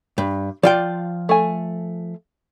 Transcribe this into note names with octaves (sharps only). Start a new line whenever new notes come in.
G2
F3 F4 D5 G5
A3 G#5